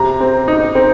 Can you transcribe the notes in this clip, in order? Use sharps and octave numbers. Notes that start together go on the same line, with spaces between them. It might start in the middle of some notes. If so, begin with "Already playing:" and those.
Already playing: C3 A#5
C4
D#4
C4